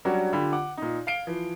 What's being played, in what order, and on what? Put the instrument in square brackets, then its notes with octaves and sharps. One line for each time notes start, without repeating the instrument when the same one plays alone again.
[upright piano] F#3 G3 C#4 D4 F#4
D3 F4 G4 B5
F#5 D6
A#2 D#4
F5 C7 D7 G7
E3 F3